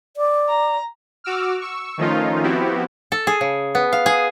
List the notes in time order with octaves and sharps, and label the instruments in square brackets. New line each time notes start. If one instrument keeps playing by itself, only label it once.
[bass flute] D5
[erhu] A#5
[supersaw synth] F#4 D6 E6 F6
C#6 E6
D#3 F3 A3 C#4 D#4 F4
F3 B3 C4 E4 F#4 G4
[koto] A4
G#4
C#3
B3
F5
G#4